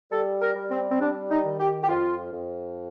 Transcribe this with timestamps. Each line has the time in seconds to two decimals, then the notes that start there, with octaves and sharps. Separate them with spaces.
0.12 G3 A4
0.42 A#4
0.56 G3
0.71 C4
0.91 C4
1.00 G3 D4
1.30 D#4
1.45 D#3
1.60 G4
1.83 G4
1.89 F2 F4
2.33 F2